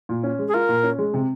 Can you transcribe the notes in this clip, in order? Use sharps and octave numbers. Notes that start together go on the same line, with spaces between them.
A#2
C#4
G#3
G#4
F4 A#4
A#2
C#4
G#3
C3